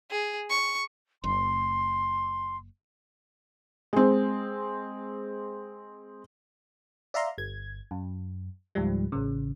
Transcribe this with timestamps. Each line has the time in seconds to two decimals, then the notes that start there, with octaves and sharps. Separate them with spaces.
0.11 G#4
0.50 C#6
1.24 F#1 C6
3.93 G#3 C4
7.14 D5 E5 F5 A#5 C6
7.38 G1 G#6
7.91 F#2
8.75 C#2 G#2 F3 G3
9.12 A1 C#3